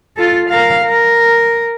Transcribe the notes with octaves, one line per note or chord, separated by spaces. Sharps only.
F4 A4
A#4 F5
A#4